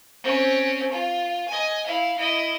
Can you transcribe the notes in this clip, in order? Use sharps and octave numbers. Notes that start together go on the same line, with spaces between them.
C4 C#4
F4
D#5 G#5
E4 F5
E4 D#5